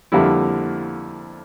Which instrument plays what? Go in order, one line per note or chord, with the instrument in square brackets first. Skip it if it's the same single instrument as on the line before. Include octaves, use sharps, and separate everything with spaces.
[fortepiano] F2 D3 G3 A#3 E4